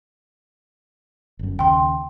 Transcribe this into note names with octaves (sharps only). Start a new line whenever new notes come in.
G1 F#2
D#2 C#3 G5 C6